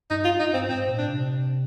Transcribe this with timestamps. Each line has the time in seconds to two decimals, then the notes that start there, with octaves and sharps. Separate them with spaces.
0.10 G2 D#4
0.25 F4
0.39 D#4
0.54 C4
0.69 G#2 C4
0.89 A#2
0.98 D4
1.08 C3